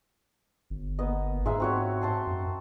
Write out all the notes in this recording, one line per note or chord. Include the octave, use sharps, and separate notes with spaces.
G1
A#3 B3 D#5
G#2 G#3 D#4 E5
C4 F#4 C#5
C5 A5 C6
F#2